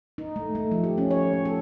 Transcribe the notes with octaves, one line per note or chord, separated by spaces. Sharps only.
D#4
A3
A3
F3
G4
C#4
C#5
A3
A4